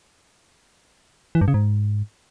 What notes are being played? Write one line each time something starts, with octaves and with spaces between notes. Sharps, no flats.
E3
G2
C#3
G#2